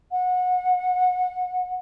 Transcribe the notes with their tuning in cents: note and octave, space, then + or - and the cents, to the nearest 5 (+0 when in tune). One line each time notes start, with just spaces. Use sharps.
F#5 -25